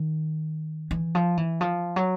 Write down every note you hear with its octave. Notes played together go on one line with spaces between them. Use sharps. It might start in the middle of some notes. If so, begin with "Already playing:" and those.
Already playing: D#3
E3
F3
E3
F3
F#3